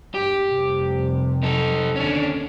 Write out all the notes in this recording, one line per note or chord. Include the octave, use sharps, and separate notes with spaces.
G2 G4
F1 C3 G3
D#4 A4
D#2 D3 C#4 D4